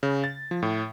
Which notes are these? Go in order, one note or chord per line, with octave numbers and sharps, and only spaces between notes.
C#3
A6
F3
A2